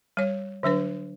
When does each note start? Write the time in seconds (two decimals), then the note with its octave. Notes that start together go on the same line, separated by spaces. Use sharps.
0.17 G3 C#5
0.63 D3 F#3 D4 B4